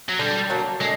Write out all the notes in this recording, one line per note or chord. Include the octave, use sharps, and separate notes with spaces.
F#3
D3 G3
F#3 A#3 D4
D3 G#3